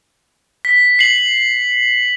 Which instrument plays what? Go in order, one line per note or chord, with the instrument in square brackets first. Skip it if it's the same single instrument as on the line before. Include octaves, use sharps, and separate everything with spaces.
[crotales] B6
C7 F#7